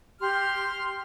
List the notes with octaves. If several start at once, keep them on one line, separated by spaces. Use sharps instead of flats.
G4 C6 F6